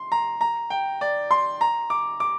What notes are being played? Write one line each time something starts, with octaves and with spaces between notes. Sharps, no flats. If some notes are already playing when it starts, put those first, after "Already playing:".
Already playing: C6
A#5
A#5
G5
D5
C6
A#5
D6
D6